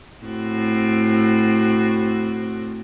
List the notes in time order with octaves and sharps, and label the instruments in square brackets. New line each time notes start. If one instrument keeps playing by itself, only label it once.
[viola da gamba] A2 C4 F#4